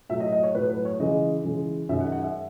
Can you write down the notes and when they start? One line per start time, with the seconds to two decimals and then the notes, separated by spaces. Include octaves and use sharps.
0.09 A2 F#3 A3 E5
0.20 D#5
0.32 D#5
0.43 C#5
0.55 A2 F#3 A3 B4
0.69 B4
0.85 C#5
1.00 C#3 E3 G#3 D#5
1.44 C#3 E3 G#3
1.89 F#2 D#3 G#3 E5
2.00 F#5
2.12 F#5
2.23 E5